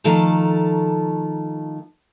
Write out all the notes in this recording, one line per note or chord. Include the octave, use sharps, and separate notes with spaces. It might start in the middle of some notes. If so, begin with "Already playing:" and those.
D#3 F3 A3 A4 A#5